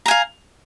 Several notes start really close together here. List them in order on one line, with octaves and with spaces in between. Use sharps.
A#5 G#5 F5